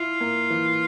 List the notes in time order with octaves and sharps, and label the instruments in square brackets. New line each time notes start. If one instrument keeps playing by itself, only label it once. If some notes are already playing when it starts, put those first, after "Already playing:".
Already playing: [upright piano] E4 [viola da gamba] F4
[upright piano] A#3
E3